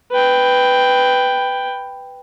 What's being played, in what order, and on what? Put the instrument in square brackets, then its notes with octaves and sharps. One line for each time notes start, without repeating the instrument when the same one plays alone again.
[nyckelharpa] B4 G5